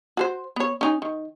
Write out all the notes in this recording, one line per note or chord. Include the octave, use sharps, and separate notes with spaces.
F#4 A4 C5
B3 C#5
C#4 D#4 G#5
D#3